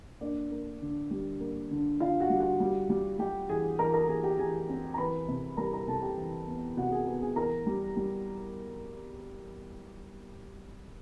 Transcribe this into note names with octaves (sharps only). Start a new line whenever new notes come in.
A#3 D4 D5
A#3
D3
G3
A#3
D3
D3 F4 F5
F#4 F#5
G3
F#4 F#5
G3
G3
G3 G4 G5
E3 G#4 G#5
E3 A#4 A#5
A#4 A#5
E3 G#4 G#5
G4 G5
E3 G#4 G#5
C4
A#5
E3 B4 B5
C3
G3 A#4 A#5
A#4 A#5
C3 A4 A5
G4 G5
E3
B3
C3 F#4 F#5
G#4 G#5
B3 G#4 G#5
G#4 G#5
E3 A#4 A#5
G3
G3